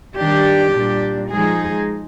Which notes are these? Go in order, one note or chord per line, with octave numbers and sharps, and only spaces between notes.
D#3 G3 D4 G4
A#2 G3 D4
F3 G#3 D#4 G#4